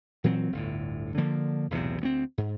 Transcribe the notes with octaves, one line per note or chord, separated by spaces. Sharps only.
A#2 E3 F#3 C4
G1 D2 A2
D3 F3 A#3
B1 E2 A2 C3
D2 B3 C4
G#2